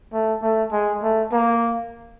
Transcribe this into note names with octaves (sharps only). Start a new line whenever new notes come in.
A3
A3
G#3
A3
A#3